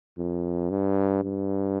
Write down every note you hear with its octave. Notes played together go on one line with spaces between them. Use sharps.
F2
G2
G2